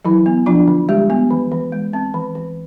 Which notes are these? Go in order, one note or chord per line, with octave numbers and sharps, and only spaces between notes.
E3 F#3 E4
B3
F3 D4 F4
D3
G3 G#3 G4
B3
E3
E3
G#3
C4
E3
E3